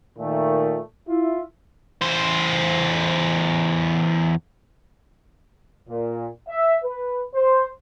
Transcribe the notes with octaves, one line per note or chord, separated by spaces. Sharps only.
A#2 D#3 A3
E4 F4 E5
E2 C5
A#2
E5
B4
C5